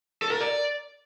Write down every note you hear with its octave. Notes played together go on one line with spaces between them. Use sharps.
A4
A#4
D5